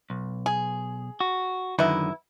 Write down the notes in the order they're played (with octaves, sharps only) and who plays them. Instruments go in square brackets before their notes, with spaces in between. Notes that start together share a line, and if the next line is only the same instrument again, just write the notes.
[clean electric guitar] B1
[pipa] G#4
[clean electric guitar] F#4
[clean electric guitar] F#2 D3 D#3 [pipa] B2 E4